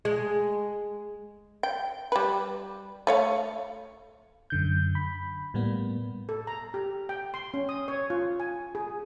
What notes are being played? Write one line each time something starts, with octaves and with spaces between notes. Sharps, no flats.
G#3
G5
G3 B4
A3 C#5 F5
F#2 D3 G6
B5
A2 G3 A#3 B3
A4
A#5
G4
G5
C6
C#4
D#6
C#5
F4
G#5
G#4